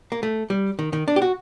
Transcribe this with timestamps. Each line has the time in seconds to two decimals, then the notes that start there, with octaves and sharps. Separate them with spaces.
0.12 A#3
0.23 A3
0.50 G3
0.79 D#3
0.93 D#3
1.08 D4
1.16 G4
1.22 F#4